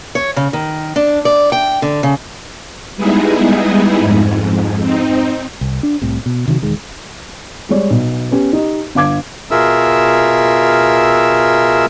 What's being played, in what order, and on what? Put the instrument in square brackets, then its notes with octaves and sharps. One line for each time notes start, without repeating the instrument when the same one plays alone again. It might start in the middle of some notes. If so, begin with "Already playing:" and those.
[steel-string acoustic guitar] C#5
C#3
D#3
D4
D5
G5
D3
C#3
[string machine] G3 G#3 B3 D#4 E4 G#4
F2 G#2
C4 D#4
[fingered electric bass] C2
D4
C2 A2 C3
B2
C3 D#3 F3 F#3
E1 D#3 G#3
[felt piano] G3 G#3 C#5 D5
B1
B3 C#4 G4
D#4 G4 D#5
G1 F5 D6 G#6
[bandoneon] B2 F4 G#4 A#4 E5 E6